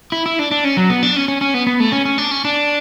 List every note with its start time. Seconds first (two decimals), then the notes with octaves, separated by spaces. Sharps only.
0.12 E4
0.26 E4
0.39 D4
0.51 D4
0.64 C#4
0.77 F#3
0.89 B3
1.03 D4
1.16 C#4
1.28 C#4
1.41 C#4
1.54 B3
1.67 B3
1.80 A3
1.92 C#4
2.05 C#4
2.18 D4
2.31 C#4
2.45 D4